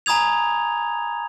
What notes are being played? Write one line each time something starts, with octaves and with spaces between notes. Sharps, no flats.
G#5 A#5 B5 D#6 G#6 F7